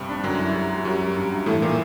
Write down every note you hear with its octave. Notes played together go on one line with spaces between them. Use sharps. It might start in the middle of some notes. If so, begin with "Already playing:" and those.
Already playing: G2 C3 G3
D4
F#2 D3 F#3
E4
G3
G3
F#2 F#3 G3
G3
G2
G2
A2 E3 A3
A#2 A#3